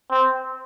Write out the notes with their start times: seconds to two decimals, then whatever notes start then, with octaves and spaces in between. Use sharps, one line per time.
0.11 C4